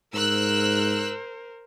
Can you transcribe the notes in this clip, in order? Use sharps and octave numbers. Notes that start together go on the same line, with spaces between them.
G#2 A#4 C5 E6 F#6